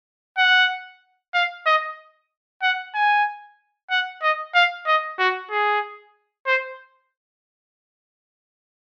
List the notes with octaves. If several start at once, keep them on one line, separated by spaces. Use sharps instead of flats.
F#5
F5
D#5
F#5
G#5
F#5
D#5
F5
D#5
F#4
G#4
C5